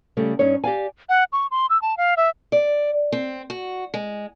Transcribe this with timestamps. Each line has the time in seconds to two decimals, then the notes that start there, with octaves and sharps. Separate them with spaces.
0.17 C#3 G3 A3
0.39 G2 C#4 D#4 C#5
0.64 G4 D5 F5 G#5
1.09 F#5
1.33 C#6
1.51 C6
1.70 E6
1.82 A5
1.97 F5
2.17 E5
2.52 D5
3.12 C4
3.50 F#4
3.94 G#3